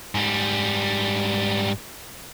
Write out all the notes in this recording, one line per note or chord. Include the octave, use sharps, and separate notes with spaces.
G#2 G3